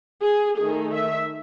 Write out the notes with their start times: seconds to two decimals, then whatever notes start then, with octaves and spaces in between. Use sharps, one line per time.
0.24 G#4
0.59 D#3 A3 D#4 G#4
0.94 E5